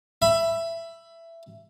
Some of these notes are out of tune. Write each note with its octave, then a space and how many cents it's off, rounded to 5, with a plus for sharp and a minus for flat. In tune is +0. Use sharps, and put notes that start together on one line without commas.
E5 +15 B5 +0